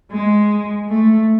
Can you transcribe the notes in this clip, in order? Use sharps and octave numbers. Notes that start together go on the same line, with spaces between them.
G#3
A3